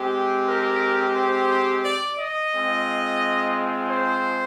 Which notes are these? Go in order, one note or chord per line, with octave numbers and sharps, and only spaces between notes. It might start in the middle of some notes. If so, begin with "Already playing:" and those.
Already playing: G#3 C4 G4
A#4
C5
D5
D#5
G#3 C4 F4
C5